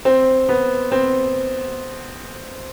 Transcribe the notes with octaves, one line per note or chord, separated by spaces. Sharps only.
C4
B3
C4